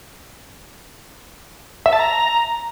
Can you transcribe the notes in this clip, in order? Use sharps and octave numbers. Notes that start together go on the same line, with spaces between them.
E5
A5
A#5